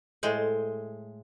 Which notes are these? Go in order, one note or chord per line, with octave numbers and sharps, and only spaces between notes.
A2 G#3 C5